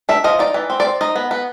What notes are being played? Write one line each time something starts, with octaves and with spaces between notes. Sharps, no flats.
D4 E5
F3 D#5
D#4 D5
E3
C4
D5
C4
D#4 D#5
B3
B3